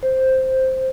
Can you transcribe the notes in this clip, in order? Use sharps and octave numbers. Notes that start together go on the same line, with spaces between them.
C5